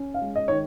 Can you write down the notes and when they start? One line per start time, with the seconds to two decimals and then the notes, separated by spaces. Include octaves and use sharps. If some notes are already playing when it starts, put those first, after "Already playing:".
Already playing: C#4
0.14 F5
0.22 G#3
0.36 D#5
0.48 D#3 C#5